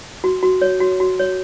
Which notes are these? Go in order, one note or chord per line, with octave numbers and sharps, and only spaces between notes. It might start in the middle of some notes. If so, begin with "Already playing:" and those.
F#4
F#4
C#5
F#4
F#4
C#5